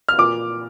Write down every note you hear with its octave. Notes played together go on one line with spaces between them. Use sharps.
F6
A#2 D6